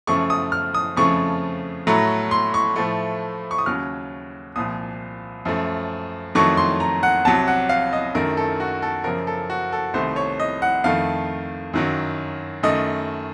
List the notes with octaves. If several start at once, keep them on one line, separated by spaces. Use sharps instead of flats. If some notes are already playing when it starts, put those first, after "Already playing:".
F#2 C#3 F3 A3 C#6
D#6
F6
D#6
F2 C#3 F3 A3 C#6
A2 F#3 A3 A#5
C6
C#6
A2 F3 A3
C#6
D#6
D#2 C#3 F#3 F6
C2 A#2 F3 D#6
F#2 F3 A3
F2 D#3 F#3 A3 C#6
C6
A#5
F#5
C2 C3 F#3 A5
F#5
F5
D#5
F#2 D#3 A3 A#4
A4
F#4
A4
F#2 C#3 F3 A#4
A4
F#4
A4
C2 C3 D#3 A3 C5
C#5
D#5
F#5
F2 D#3 A3 F5
F#2 D#3 F#3
F#2 D#3 A3 D#5